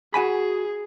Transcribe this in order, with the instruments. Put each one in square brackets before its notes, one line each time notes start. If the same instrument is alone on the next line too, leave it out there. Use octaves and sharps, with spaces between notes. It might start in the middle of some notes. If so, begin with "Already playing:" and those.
[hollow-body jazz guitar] F#4 G#5 B5 [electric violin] G#4